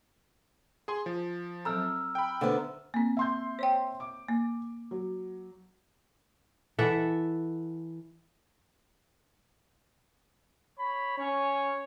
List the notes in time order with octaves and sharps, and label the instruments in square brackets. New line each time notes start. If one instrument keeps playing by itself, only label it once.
[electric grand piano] G#4 G#5 C6
F3
[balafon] F#3 C4 A4 [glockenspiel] A#5 E6 F6
[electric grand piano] G5 B5
[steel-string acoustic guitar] D3 B3 [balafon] C5 E5 F#5
[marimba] A#3 C4
[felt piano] E5 C6 G6
[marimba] C5 C#5 G5
[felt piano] D6
[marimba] A#3
[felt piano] F#3
[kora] E3 A4 E5 F#5
[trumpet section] C#5 B5
[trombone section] C#4 [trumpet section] C#5